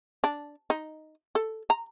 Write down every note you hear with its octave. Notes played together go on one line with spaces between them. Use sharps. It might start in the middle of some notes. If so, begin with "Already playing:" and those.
D4
D#4
A4
A#5